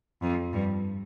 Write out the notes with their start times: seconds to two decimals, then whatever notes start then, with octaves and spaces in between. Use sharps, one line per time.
0.22 F2
0.53 G2